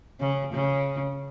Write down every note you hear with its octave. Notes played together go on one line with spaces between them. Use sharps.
C#3
C#3